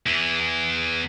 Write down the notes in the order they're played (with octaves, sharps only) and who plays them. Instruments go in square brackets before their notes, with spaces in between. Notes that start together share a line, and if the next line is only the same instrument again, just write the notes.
[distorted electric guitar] E2 E3